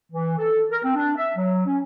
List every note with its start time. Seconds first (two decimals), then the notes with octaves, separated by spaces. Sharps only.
0.13 E3
0.38 A4
0.72 A#4
0.83 C4
0.96 D4
1.17 E5
1.36 F#3
1.66 C#4